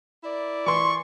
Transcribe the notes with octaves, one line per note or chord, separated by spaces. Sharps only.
E4 A#4 D5
E3 C6 C#6